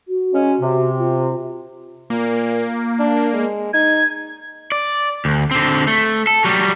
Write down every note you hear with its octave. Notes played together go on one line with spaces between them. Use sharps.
F#4
C#3 G#3 C#4
C3
F4
A#2 A#3
D4
G#3
D#4 G#6
D5
D2
D3 C4
A3
A4
F#3 G3